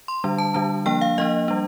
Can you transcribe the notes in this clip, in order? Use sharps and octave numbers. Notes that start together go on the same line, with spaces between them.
C6
D3 G3 D4
A5
D3 G3 D4 A5
F3 A#3 D4 G5
F5
F3 A#3 D4 D#5
G3 D4